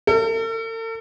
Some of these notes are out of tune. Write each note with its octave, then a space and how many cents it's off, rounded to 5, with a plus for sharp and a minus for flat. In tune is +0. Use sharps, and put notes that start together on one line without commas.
A4 +45